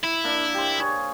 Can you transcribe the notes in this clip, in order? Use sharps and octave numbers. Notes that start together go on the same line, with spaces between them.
E4
A#3 D4
G4 C5
G#4 C#5